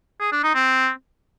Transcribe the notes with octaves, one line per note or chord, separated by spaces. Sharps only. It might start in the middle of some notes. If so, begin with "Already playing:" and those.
G#4
D4
D#4
C4